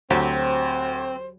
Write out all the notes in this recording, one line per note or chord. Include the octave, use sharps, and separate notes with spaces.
D2 F#3 C4 G4 C5